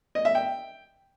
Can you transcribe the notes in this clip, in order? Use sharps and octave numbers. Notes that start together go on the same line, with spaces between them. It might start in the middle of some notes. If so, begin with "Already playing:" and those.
D#5
E5
G5